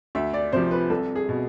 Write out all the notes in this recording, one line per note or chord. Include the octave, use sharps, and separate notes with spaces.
D2 E5
D5
C3 F3 C5
B4
C2 A4
G#4
B2